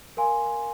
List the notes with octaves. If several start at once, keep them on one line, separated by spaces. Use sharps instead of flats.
A#4 F5 G#5 C6